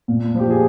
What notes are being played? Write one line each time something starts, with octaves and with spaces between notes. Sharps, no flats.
A#2
F3 G4
G#4